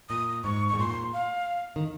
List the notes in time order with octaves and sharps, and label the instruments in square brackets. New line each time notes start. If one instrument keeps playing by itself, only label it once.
[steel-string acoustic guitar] A#2 [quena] D#6
[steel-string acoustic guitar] G#2 [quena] C#6
[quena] C#6
[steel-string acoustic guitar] G#2
[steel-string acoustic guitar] A#2 [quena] C6
[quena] F5
[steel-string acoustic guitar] D#3